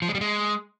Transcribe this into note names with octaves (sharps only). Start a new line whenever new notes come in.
F3
G#3
G3
G#3